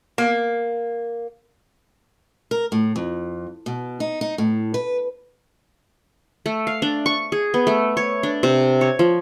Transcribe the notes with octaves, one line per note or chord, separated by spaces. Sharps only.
A#3
A#4
A2
F2
B2
D#4
D#4
A2
B4
A3
F5
D4
C#6
G#4
B3
A3
C#5
D4
C3
C#5
F3